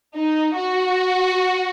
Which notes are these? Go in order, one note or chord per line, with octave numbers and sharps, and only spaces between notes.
D#4
F#4